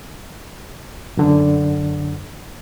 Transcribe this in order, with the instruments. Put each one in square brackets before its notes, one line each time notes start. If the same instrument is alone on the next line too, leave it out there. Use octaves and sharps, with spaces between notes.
[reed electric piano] F#2 D3